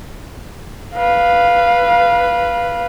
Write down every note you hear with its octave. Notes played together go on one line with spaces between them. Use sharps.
B4 F5